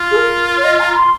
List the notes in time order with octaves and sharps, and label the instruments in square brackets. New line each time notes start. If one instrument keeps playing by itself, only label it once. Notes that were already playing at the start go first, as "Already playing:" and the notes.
Already playing: [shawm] F4
[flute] G#4
A#4
C#5
D#5
A#5
C6